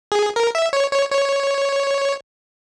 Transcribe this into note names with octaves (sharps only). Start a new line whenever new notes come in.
G#4
A#4
E5
C#5
C#5
C#5